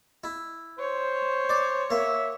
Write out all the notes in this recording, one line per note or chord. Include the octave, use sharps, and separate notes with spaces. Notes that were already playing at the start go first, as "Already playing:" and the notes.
E4
C5 C#5
D5
A#3 E5